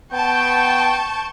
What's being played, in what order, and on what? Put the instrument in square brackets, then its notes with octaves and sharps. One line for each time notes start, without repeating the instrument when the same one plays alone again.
[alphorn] B3 [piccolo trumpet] G5 [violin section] A5 C#6 G6